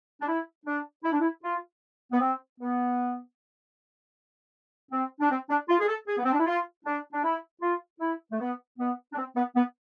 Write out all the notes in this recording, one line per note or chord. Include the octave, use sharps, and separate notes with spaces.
D4
E4
D4
E4
D4
E4
F4
B3
C4
B3
C4
D4
C4
D4
F4
G#4
A4
G#4
B3
C4
D4
E4
F4
D4
D4
E4
F4
E4
A3
B3
B3
D4
C4
B3
B3